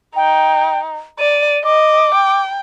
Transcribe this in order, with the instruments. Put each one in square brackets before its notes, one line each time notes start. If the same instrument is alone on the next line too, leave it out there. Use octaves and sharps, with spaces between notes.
[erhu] D#4 [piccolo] G5
[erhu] D5 [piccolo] D#7
[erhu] D#5 [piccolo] D6
[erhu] G5